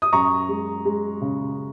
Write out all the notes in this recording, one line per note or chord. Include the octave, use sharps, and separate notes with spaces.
D#6
F#2 A#5 C#6
G#3
G#3
C#3